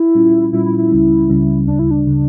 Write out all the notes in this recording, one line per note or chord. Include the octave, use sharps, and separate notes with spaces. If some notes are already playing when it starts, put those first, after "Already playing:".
Already playing: E4
A#2 G3 C#4 F4
A#2 G3 C#4 E4 F4
E4
E4
C#2 C#3 G3 C#4
C#2 C#3 G3 C#4
D2 C#3 G3 D4
E4
D4
C#3 G3